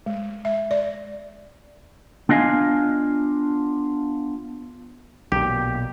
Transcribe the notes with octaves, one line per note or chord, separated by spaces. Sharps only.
G#3
E5
D5
B3 D4 F4 D#5 F5 G#5
B1 A#2 G4